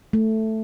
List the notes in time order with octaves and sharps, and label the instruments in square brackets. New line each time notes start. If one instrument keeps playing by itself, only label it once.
[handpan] A3